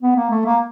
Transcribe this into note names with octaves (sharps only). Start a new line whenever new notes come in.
B3
A#3
A3
A#3